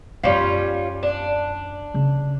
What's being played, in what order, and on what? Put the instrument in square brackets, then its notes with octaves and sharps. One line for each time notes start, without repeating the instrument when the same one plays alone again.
[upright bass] F#2 D#4 [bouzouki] G3 C#4 F4
[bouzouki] D4
[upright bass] C#3